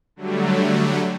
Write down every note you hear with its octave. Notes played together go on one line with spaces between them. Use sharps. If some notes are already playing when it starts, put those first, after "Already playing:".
D3 F#3 G3 A3